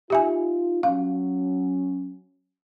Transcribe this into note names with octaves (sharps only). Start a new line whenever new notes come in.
D#4 F4 G4 E5 G#5
F#3 C#4 F5